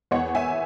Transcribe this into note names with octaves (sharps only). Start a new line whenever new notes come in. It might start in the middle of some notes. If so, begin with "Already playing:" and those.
E2 C#5 F#5
E5 G#5